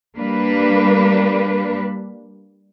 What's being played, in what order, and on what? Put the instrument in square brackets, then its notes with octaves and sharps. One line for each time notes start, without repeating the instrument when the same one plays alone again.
[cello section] G3 A#3 D4 B4